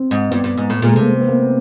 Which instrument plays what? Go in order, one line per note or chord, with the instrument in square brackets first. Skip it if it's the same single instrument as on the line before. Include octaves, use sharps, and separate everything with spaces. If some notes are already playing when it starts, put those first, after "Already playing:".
Already playing: [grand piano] C4
[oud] G#2
[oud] G2 [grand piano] B3
[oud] G2
G#2
A2
[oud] A#2 [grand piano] G#3
[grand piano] A3
[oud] C3 [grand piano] A#3
[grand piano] B3
B3
A#3